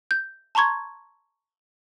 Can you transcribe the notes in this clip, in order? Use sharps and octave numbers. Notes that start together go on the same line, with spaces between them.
G6
A5 A#5 C6 C#6 G#6